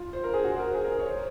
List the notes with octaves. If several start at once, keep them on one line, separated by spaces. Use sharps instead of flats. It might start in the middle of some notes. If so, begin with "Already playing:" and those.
Already playing: F4
C5
A#4
G#4
F#4
C5
A#4
G#4
A#4
C#5
C5